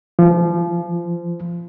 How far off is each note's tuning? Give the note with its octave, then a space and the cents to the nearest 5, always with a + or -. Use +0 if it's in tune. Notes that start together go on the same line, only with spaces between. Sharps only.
F3 -25